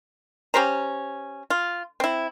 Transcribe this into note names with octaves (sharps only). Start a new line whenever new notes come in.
C#4 G4 C5 A#5
F4
C4 E4